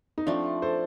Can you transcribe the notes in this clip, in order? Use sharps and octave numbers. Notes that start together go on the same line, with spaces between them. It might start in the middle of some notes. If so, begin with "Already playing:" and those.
D#4
F3 A3 C4 D4
A4 C5